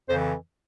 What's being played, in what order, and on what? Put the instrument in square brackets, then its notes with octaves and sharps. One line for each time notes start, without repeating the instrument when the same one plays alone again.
[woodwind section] F2 C#3 E3 C5